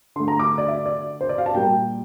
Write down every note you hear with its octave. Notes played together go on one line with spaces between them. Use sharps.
D3 A3 C6
A#5
D6
D5
E5
D5
C5
D5
F5
A5
A#2 G3 A#3 G5